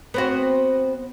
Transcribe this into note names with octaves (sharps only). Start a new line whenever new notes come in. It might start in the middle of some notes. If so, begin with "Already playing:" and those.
B3 C4 F#4